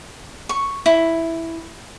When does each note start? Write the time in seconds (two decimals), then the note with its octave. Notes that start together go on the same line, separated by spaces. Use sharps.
0.49 C#6
0.86 E4